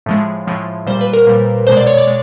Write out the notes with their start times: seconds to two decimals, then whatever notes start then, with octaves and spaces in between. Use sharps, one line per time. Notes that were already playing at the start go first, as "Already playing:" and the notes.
0.06 A2 F3 G#3
0.47 A2 F3 G#3
0.86 A#2 G3 C5
1.01 B4
1.13 A#4
1.27 A#2 G3
1.67 B2 G#3 C5
1.77 D5
1.87 C#5
1.97 D5
2.07 G#3